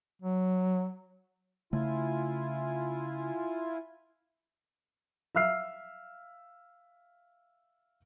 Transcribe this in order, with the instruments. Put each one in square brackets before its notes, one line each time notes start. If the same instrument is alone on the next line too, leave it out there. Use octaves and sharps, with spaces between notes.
[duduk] F#3
[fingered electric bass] C#3 A3 [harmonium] E4 F4 G#5
[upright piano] E5 F5 E6 F6 C7